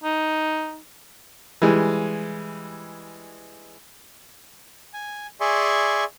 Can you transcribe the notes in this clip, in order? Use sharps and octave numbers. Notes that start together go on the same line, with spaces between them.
D#4
E3 G3 G#3
G#5
G#4 D5 E5 G#5 C6 C#6